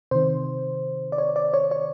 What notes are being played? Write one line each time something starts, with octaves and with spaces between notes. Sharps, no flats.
C3 D#3 C5
D5
C#5
D5
C#5
C#5